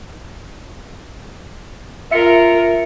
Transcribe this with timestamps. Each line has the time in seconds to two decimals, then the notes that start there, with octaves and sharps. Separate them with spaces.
2.11 F4 A#4 E5 C#7